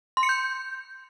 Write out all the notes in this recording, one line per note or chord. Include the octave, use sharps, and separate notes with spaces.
C6
C#7
G6